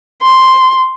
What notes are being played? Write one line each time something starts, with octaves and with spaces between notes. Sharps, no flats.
C6